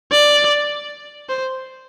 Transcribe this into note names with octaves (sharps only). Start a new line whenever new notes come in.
D5
C5